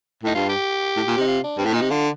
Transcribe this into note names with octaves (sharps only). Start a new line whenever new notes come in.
A2 D#4
G2 F4
G4
A2
A#2
C3 D#4
F4
D4
G2 C4
A2
A#2 D#4
C3
D3 F4